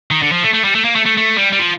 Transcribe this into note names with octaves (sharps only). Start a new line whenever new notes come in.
D#3
D3
F3
A3
A3
G3
A3
A#3
A3
A3
A3
G3
G3
F3